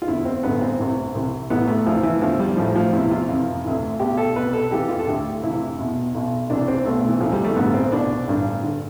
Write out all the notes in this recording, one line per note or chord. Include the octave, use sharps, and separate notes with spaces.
F4
E2 D3 E4
C4
A1 G2 D3 B3
C4
C2 C3 E3
C2 C3 E3
A1 A2 E3 B3
A3
D2 C3 E3 F3
E3
E2 D3 F3
G3
A1 A2 E3 F3
F3
E2 C3 E3 E4
F4
F2 C3 E3
D2 C3 E3
B1 B2 G4
A4
C2 B2 B4
A4
F2 E3 G4
F4
A4
D2 D3 G4
F2 C3 E3 E4
E2 B2
B1 B2
C2 C3 E3 D4
C4
B1 B2 A3
E3
D2 C3 E3 F3
G3
A3
A1 G2 D3 B3
C4
C2 B2 D4
A1 G2 D3
D3